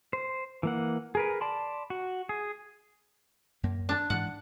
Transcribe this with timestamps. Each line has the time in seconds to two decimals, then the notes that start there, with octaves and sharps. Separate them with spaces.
0.13 C5
0.63 E3 A#3 F#5
1.15 G#4 A#4 B4
1.41 D5 A5 B5 C6
1.90 F#4
2.29 G#4
3.63 F#2 A#3
3.89 D4
4.10 G#2 E3 F#5